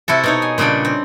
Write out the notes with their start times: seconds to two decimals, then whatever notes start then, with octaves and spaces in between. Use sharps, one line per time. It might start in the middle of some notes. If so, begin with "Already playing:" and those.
0.08 C3 E4 F#4 A4
0.23 B2 D#4 C#5
0.42 G#5
0.58 A#2 C#3 G3 D4 G5
0.85 C4